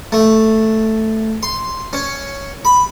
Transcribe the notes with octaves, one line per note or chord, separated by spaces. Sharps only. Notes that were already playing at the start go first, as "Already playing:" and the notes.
A3
C6
C#4
B5